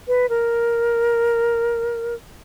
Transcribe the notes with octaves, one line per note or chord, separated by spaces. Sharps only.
B4
A#4